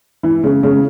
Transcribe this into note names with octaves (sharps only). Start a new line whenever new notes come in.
E3
C#3
C#3